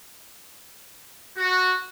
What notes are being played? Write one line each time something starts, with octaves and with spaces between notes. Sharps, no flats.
F#4